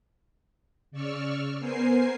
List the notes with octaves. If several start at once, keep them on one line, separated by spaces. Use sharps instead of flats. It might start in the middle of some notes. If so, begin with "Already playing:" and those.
C#3 D5 C#6 E6 F6
B3 A#4 C5 G#5 C7